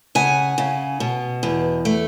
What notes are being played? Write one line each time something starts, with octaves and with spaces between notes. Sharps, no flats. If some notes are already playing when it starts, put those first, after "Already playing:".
C#3 F#5 G#5
C#3
B2
E2
A3